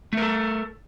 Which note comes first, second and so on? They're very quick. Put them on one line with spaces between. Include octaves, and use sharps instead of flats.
A3 A#4 A4